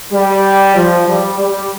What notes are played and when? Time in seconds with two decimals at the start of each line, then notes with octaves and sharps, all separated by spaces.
0.13 G3
0.75 F3
1.07 G3
1.39 G3